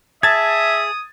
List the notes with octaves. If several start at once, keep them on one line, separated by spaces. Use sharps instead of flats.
G#4 E5 A5 D#6 G#6 A6